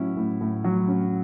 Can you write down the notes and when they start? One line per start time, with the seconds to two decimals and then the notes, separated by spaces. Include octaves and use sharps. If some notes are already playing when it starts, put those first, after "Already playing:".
Already playing: A2 F#3 C#4 E4
0.17 A2
0.41 A2
0.64 F#3
0.88 C#4